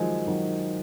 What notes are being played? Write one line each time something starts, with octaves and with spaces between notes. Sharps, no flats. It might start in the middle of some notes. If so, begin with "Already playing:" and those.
Already playing: D#3 F3 F#3 G#3
D#3 F#3